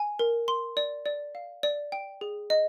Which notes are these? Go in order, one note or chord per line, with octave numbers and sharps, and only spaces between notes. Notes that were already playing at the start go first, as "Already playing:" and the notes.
Already playing: G#5
A#4
C6
D5
D5
F5
D5
G5
G#4
D#5